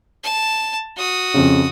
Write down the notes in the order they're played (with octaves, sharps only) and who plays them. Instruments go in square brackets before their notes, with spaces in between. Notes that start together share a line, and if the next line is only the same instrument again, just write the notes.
[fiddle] A5
F#4 D#6
[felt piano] F2 C#3